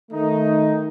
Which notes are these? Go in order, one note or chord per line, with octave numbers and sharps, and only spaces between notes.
D#3 A3 D#4